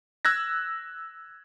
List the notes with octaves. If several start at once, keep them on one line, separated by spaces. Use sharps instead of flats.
E6 F#6 G#6 A#6